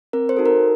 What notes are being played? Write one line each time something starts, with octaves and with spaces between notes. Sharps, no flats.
C4 A#4
C5
D#4 F#4 A4
A#4